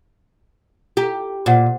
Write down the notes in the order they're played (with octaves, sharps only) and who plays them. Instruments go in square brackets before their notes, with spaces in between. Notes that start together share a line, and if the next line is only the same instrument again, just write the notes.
[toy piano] E4 A#5 [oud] G4
[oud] A#2 [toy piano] C5 F#5